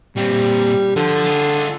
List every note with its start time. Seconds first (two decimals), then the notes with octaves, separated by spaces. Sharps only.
0.17 A#2 G3 C4
0.96 D3 F3
1.24 F4 G#4